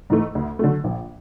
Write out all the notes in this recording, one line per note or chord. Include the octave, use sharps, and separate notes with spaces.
G#2 E3 A3
D2
D3 F#3 A3
A#1